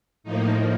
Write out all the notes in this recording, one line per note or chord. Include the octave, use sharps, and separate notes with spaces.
A2 F3 A#3 D#4